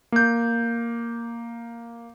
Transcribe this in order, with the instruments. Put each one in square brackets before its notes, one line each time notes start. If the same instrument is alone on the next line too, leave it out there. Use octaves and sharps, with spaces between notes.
[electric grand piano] A#3 G6